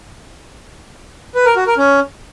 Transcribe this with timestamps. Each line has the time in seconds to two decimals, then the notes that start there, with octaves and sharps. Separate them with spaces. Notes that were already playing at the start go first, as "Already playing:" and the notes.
1.35 B4
1.46 A#4
1.56 F#4
1.67 A#4
1.77 C#4